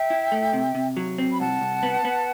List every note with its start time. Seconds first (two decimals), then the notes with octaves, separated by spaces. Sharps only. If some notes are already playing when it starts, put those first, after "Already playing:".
Already playing: E5 G5
0.10 E4
0.32 A3
0.53 C3
0.75 C3
0.97 F#3
1.18 C4
1.32 B5
1.39 C2 F#5 A5
1.61 C2
1.83 B3
2.05 B3